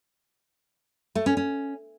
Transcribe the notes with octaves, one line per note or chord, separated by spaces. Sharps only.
A3
C#4
C#4